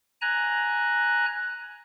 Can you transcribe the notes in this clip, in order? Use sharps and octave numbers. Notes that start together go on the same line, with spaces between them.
G#5 A#5 F#6